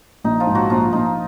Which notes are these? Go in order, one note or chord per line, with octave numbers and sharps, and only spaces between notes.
A#1 D#4
F3 F4
G#2
F#3 F#4
A#1 F3 F4
A#1 D#4